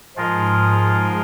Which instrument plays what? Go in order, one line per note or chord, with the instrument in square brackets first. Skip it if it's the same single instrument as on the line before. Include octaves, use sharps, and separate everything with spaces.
[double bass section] G#2 [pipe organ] F3 G#3 F4 A#4 D#5